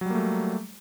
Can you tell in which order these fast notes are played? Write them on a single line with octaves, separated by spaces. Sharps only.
F#3 G3 A#3 A3